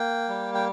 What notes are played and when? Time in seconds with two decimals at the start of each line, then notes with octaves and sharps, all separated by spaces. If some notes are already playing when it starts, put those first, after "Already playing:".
Already playing: A#3 G5
0.29 G3
0.55 G5